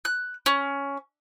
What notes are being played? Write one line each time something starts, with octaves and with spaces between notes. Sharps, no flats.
F#6
C#4